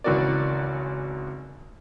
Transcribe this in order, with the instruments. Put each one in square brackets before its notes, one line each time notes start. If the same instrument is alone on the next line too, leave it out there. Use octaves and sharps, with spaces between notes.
[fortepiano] G#1 C#2 E3 F#4 A#4 D5